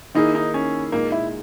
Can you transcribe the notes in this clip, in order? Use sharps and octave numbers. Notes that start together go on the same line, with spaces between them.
D#3 A#3 D#4 E4 G#4
D#4
C#4
A#2 G#3 A#3 D#4
E4